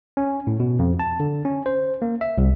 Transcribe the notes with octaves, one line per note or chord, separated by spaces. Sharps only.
C#4
A2
B2
F2
A5
D3
C#4
C5
A#3
E5
C2